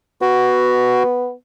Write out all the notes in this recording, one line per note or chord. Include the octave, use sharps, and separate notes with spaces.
B3 F#4